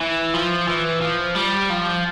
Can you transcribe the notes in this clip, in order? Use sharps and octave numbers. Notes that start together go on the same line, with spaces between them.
E3
F3
E3
F3
G3
F3